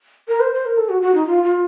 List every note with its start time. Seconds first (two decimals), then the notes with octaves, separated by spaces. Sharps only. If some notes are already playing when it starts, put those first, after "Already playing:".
0.28 A#4
0.40 C5
0.53 C5
0.65 A#4
0.78 A4
0.89 F#4
1.02 F#4
1.14 D#4
1.27 F4
1.43 F4